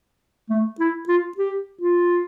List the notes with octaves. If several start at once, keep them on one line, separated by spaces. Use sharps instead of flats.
A3
E4
F4
G4
F4